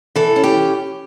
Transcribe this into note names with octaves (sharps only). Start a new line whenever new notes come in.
E3 A4
C#4
G4